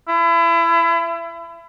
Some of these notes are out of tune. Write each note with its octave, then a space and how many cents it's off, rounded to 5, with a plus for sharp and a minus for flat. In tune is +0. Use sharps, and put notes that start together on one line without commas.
E4 +30